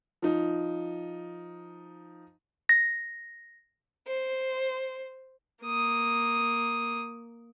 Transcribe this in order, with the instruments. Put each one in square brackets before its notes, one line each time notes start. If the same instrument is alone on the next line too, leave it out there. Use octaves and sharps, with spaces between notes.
[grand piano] F3 D#4
[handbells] A#6
[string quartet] C5
[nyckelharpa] A#3 D#6